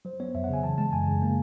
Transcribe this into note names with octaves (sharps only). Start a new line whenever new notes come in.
F#3 C5
B3 C#5
F2 E5
F#5
C#3 G#5
E3 A5
G#3 A5
F#2 G#5
C#3
A#3